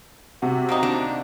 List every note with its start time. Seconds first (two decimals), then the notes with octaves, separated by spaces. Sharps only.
0.42 C3 F#4
0.69 A#3 C4 D#4
0.83 D4